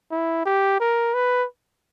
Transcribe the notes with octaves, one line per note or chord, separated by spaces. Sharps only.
E4
G4
A#4
B4